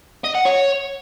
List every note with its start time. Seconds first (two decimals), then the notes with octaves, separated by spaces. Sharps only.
0.24 D#5
0.35 F#5
0.46 C#5